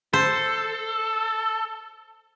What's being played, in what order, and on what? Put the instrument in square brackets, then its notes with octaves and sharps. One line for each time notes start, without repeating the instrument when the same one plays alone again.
[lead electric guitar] A4 [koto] C5